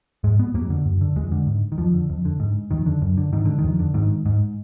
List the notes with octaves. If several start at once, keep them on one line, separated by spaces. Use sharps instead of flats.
G#2 G#3
B3
F2 A#3
D3
F#2
D3
F2 G#3
D3
G#2
D#3
F2 F3
D3
F2
D3
G#2
F2 D#3
D3
F#2
D3
G#2 D#3
D3
D#3
F2
D3
G#2 D#3
G#2